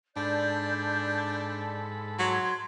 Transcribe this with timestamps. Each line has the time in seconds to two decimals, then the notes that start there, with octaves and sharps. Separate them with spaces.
0.16 G#2 D4 A4 D5 B5 G6
2.19 F#3 C6 G#6